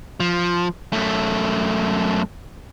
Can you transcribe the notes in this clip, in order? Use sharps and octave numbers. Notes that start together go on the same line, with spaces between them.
F3
F#2 A3